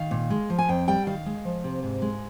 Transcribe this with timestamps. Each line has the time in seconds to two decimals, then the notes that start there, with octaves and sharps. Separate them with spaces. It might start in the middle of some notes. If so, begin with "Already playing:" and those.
Already playing: D#3 F5
0.11 A#2
0.30 G#3
0.50 F3
0.59 G#5
0.69 F2 G5
0.87 G3 G5
1.07 D#3 F5
1.26 G#3
1.45 F3
1.64 C3
1.83 G#2
2.02 G#3